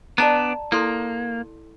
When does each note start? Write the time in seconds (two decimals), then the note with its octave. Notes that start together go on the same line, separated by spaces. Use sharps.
0.18 B3 D4 D5 A5 A#5
0.72 A#3 E4 A4 C6